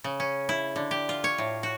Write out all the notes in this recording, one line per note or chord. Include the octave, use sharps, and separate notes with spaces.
C#3
C#4
E4
D3
G4
F4
C#5
A2
F#4